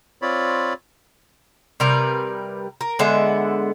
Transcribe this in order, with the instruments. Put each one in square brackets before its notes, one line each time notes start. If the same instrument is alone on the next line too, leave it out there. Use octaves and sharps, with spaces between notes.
[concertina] C4 F4 C#5 D5 B5
[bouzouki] C3 G3 A#4 B4
A#4
D3 G#3 B3 E5